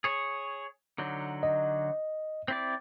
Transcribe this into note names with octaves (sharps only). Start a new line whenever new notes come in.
G#4 C#5
D3 F#3 D#4
D#5
C4 E4 D5